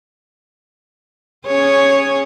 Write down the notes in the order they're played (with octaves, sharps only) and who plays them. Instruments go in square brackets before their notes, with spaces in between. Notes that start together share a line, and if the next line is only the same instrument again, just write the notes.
[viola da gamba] C#4 G#4 C#5